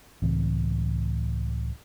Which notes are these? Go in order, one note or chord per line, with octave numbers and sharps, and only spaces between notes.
C#2 A2 E3 C4